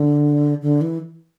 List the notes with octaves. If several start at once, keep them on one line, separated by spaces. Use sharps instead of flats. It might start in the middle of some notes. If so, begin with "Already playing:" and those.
Already playing: D3
D3
E3